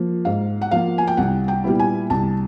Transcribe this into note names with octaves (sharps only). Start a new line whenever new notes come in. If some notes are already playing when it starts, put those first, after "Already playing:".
Already playing: F3 A#3
G#2 F5
F#5
F3 A#3 F5
G#5
G5
C2 F#5
G5
A#2 G3 B3 E4
G#5
C2 A5